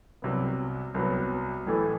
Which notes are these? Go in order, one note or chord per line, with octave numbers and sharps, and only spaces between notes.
C2 C3 F#3 B3
C2 C3 F#3 B3
A1 A2 E3 A3